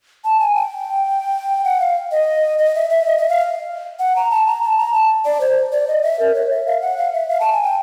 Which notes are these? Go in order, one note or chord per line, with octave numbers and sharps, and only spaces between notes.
A5
G#5
G5
F#5
F5
D#5
D#5
E5
E5
D#5
E5
F5
F#5
A#5
A5
A#5
A5
A#5
A5
D5
C5
D5
D#5
E5
A#4
C#5
E5
F5
F#5
F5
E5
F5
A5
G#5
G5